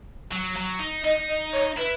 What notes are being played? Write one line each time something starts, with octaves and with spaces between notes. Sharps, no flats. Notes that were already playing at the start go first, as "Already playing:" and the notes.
F#3
F#3
D#4
D#4 D#5
D#5
C#5
E4 B4